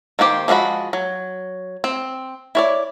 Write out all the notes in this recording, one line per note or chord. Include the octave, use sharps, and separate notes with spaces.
D#3 A#3 F#4 G4 C5
F3 G#3 F4 F#4 B5
F#3
C4
E4 C#5 D5